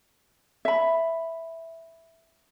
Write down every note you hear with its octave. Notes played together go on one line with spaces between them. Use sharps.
E5 B5